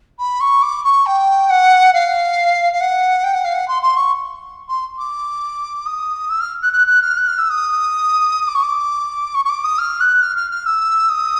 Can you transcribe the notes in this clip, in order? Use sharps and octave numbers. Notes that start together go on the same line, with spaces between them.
B5
C#6
D6
C#6
G5
F#5
F5
F5
F#5
G5
F#5
F5
F#5
C6
C6
C#6
C6
D6
D#6
E6
F6
F#6
F#6
F#6
F6
F#6
F6
E6
D#6
D6
C#6
D6
C#6
C#6
D6
D#6
F6
F#6
F6
F6
F6
E6
D#6